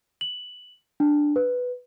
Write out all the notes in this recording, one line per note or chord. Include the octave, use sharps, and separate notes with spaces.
F#7
D4
B4